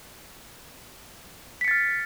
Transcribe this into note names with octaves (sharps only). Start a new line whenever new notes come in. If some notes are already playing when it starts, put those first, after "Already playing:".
F6 A6 B6 C#7